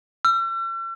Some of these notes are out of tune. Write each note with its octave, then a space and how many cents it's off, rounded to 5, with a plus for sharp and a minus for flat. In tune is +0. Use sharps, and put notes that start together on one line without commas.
E6 +40